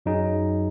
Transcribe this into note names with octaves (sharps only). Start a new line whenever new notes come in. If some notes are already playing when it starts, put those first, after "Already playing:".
F#2 F#3 D#4 G#4